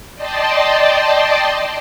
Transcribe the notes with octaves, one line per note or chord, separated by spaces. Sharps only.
D5 D#5 G5 A5 C6